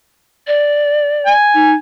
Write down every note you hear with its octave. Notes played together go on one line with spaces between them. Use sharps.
D5
G#5
D#4